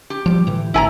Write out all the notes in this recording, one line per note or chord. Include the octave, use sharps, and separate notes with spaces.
G4
F3 G3
A2 D3 E3
G#1 E4 G#5 A#5